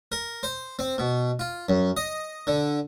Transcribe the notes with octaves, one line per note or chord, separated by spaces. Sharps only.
A#4
C5
C4
B2
F4
F#2
D#5
D3